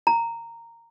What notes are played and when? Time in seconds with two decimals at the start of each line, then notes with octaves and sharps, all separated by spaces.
0.07 A#5